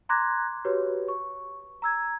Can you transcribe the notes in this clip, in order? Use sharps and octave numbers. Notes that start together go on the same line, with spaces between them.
A#5 C6 D6 F#6 G#6 A#6
F#4 G4 B4 C#5
C#6
A#5 E6 G#6